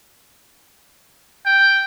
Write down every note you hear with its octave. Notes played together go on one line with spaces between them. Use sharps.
G5